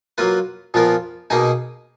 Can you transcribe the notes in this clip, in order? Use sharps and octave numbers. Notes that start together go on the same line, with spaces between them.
F#3 A#3 F4 B4
A#2 F3 B3 F4 A#4
B2 A#3 D#4 G#4